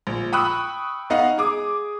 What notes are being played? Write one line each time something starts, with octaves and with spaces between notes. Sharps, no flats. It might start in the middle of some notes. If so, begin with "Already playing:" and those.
A#1
G5 B5 C#6 D#6 E6 F#6
B3 D#4 D#5 F5 F#5
G#4 D6 D#6